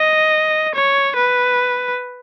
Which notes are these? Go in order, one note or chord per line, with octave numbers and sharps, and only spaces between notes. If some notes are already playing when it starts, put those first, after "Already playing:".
Already playing: D#5
C#5
B4